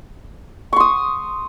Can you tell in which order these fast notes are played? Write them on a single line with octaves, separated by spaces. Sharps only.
C#6 C6 D#6